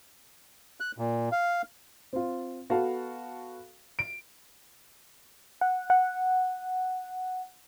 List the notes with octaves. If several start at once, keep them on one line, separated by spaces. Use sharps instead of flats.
F#6
A#2
F5
C4 F4
B3 F#4 A4 F5 A5
D7
F#5
F#5